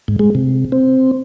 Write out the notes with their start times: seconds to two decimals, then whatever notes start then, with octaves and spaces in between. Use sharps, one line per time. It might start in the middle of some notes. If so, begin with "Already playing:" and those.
0.08 G#2
0.19 G#3
0.35 C3
0.72 C4